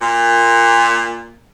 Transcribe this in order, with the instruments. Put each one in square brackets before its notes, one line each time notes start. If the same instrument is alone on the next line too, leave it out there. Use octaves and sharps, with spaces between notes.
[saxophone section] A#2